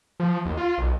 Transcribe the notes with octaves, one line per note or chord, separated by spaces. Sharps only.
F3
D#2
F4
B1